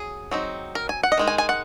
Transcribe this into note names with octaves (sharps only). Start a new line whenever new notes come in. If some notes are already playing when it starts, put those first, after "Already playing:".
Already playing: F#3 G#4
F#3 C4 D#4
A#4
G#5
F#5
D#5
D#3 G#3 D#4
G#5
G#5
F#5